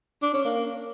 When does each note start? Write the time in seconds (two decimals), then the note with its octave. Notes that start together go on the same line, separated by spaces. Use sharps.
0.22 D4
0.34 C#4
0.45 A#3